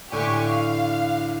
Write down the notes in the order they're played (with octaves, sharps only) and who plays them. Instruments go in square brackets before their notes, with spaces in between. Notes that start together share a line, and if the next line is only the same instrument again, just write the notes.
[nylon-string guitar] A2 D3 [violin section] G4 G#5 C#6
[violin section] F5